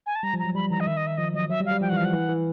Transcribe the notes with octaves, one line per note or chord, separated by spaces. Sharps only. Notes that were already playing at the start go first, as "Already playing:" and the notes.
G#5
A5
G3 A#5
F3
F#3 A#5
G3 B5
E3 A#5
D#5
D#3 E5
D#5
E5
F3 D#5
F#3 D#5
F#3 E5
G3
F5
G3
F3 G5
E3 F#5
F5
F3 F#5
E3
E3